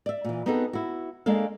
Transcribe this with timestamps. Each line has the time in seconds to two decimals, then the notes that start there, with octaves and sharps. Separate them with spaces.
0.06 D5 E5
0.25 A#2 E3
0.46 B3 C4 D#4 F#4 G#4 A4
0.73 E4 F#4
1.26 G#3 A#3 D4 A4 F5